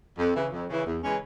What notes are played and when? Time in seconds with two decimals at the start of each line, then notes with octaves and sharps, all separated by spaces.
0.18 F2
0.35 C#3 E3
0.52 F2
0.68 C#3 E3
0.85 E2
1.03 C#3 E3 G#3 C#4